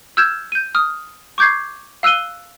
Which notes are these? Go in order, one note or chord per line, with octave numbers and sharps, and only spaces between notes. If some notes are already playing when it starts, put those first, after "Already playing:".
E6 F6 G6 G#6 E7
G6 D#7
D#6 F6
C#6 D6 G6 G#6 C7
F5 E6 F#6 D#7 G7